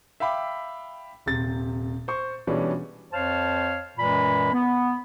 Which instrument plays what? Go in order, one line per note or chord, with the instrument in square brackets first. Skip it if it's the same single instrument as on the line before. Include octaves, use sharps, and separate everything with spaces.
[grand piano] E5 F5 G5 B5 D6
D#1 C3 A6
C5 C#6
B2 E3 G3 G#3 C#4 D4
[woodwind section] F2 C5 C#5 F5 A5 F6
F#2 A#2 E3 G#3 B5
B3